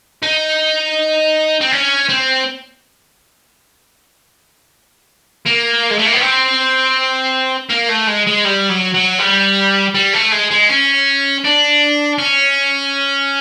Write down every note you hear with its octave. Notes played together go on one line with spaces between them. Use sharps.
D#4
C4
C#4
C4
A#3
G#3
A3
A#3
B3
C4
A#3
A3
G#3
G#3
G3
F#3
F#3
G3
G3
A3
G#3
G#3
C#4
D4
C#4